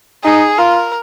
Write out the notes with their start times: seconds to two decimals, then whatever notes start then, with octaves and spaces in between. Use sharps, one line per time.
0.24 D#4 G#4
0.58 F4 A#4